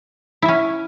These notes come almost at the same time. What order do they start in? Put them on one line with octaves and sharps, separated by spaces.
E4 E5 C#4